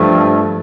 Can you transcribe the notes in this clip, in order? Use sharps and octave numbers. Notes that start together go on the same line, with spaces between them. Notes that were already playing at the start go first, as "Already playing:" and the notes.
Already playing: G2 F3 A3